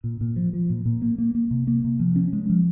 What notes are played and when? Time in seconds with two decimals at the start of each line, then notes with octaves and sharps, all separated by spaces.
0.04 A#2
0.21 A#2
0.36 F3
0.53 F3
0.70 A#2
0.86 A#2
1.02 A#3
1.18 A#3
1.35 A#3
1.51 C3
1.67 A#3
1.84 C3
2.00 F3
2.16 C#4
2.33 G#3
2.50 F3